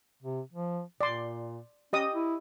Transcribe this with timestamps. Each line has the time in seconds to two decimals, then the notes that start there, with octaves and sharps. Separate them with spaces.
0.23 C3
0.53 F3
1.01 A#2 D5 C6
1.93 C#4 G4 D#5 D#6
2.14 E4